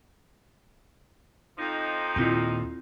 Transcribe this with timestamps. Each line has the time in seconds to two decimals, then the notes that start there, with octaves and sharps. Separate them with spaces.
1.58 F2 F3 D#4
2.16 D#2 A#2 C4 E4 F4